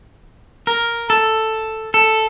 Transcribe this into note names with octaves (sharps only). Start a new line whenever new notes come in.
A#4
A4
A4